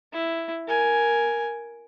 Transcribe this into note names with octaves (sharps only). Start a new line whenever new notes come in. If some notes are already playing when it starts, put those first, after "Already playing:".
E4
A#4 G#5